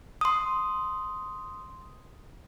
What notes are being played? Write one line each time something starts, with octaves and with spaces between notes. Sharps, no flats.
C6 D#6